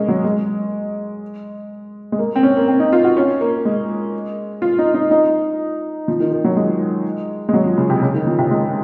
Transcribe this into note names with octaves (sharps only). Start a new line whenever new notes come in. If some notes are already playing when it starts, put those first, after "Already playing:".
Already playing: G#3 A#3 C#4
F#3
G#3
G#3
A#3
C4
C#4
A#3
C4
D#4
F4
F#4
C#4
A#3
G#3
F4
D#4
D#4
D#4
F3
D#3
D#3
F#3
G#3
G#3
F#3
F3
C#3
C3
C#3
D#3
F3
C3
G#3